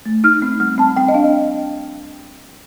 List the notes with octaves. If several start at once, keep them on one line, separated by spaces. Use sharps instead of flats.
A3
D#4 F6
C4
G3 F6
C4 A5
C4 G5
D#5
D4 F5
D#5